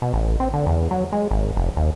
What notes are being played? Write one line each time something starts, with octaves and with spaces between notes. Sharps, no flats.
B2
A1
C4
D3
E2
F#3
G#3
G#1
F1
D#2